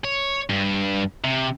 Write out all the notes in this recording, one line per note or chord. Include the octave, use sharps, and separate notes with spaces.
C#5
G2
C3